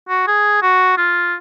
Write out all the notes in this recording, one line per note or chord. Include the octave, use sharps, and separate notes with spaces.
F#4
G#4
F#4
F4